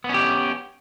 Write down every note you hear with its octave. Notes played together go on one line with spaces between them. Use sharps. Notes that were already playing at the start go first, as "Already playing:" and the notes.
B3 C#4 G4